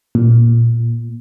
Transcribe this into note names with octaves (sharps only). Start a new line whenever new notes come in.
A#2